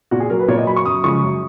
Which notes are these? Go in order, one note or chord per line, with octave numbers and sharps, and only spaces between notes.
A#2 F#4
G#4
F#3 A#4
B4
A#2 C#5
D#5
F#3 B5
C#6
F#2 D#6
C#3 F3 G#3 C#6
F#2